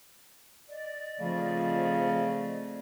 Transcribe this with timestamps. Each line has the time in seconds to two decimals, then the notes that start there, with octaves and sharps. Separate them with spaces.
0.68 D5 D#5
1.20 C#3 F3 A3 C4